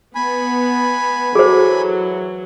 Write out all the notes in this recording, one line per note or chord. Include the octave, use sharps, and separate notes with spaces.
B3 G#5 B5
E3 F#3 F#4 G#4 A4 C5